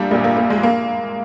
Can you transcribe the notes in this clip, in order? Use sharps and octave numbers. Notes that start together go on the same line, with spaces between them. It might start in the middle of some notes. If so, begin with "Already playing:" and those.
Already playing: A#1 A#2 G3 A#3 D4
A#1 A#2 G3
A#3
A#3
G#3
A#3